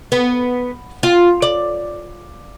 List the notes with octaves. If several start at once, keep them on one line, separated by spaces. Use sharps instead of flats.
B3
F4
D5